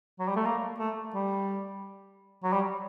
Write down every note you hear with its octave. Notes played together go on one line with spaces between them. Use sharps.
F#3
G3
A3
A#3
A3
G3
F#3
G3